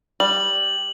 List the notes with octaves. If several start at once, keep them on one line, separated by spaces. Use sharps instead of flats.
G3 F#7